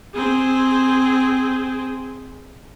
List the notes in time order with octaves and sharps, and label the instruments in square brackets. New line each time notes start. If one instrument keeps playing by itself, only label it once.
[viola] C4 G#4